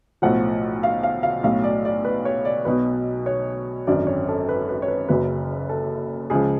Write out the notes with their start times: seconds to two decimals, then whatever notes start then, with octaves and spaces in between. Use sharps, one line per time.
0.22 B1 A2 F3 F#5
0.83 F5
1.03 F5
1.23 F5
1.43 B1 A2 F#3 F5
1.64 D5
1.85 D5
2.05 B4
2.25 C#5
2.45 D5
2.65 B1 B2 F#3 B4
3.26 C#5
3.87 G#1 F#2 D3 F#3 D5
4.07 C#5
4.28 A4
4.49 B4
4.69 B4
4.82 C#5
4.88 B4
5.08 F#1 F#2 C#3 F#3 B4
5.69 A4
6.30 C#2 C#3 F3 G#4